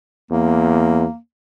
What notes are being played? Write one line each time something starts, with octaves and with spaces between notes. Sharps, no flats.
E2 A#3